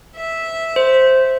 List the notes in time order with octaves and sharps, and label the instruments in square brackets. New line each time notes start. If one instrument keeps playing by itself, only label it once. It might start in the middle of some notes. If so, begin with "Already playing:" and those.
[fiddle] E5
[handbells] C5